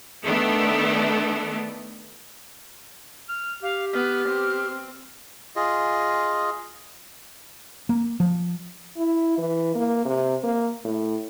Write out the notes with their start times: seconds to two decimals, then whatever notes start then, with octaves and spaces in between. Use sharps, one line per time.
0.24 D#3 A3 B3 D4
3.29 F6
3.63 G4 F5
3.94 B3 F6
4.28 C4
5.56 F4 G#4 D#5
7.89 A#3
8.20 F3
8.97 E4
9.38 E3
9.75 A#3
10.05 C3
10.43 A#3
10.85 A2